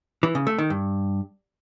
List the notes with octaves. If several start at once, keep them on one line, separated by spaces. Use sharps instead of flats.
E3
C#3
A3
D#3
G2